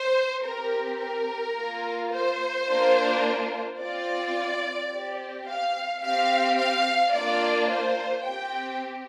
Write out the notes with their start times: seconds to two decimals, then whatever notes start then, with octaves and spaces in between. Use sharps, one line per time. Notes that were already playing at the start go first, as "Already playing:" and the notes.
Already playing: C5
0.44 C4 G4 A#4
1.00 A#4
1.56 A#3 F4
2.12 C5
2.68 A#3 D4 F4
3.79 C4 F4 D5
4.91 C4 G4
5.47 F5
6.02 C4 G4 F5
6.58 F5
7.14 A#3 D4 F4 D5
7.70 C5
8.25 C4 G4 G5